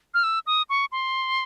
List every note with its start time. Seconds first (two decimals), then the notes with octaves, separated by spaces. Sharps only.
0.14 F6
0.24 E6
0.47 D#6
0.70 C#6
0.92 C6